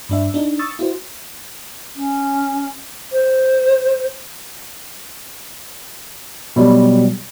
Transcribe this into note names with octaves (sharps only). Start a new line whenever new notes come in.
G2 D4 E5
D4 D#4
C#6 D#6 E6 A6
E4 F#4 C5
C#4
C5
B2 F#3 G3